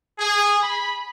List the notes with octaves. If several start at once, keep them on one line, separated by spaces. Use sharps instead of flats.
G#4
B5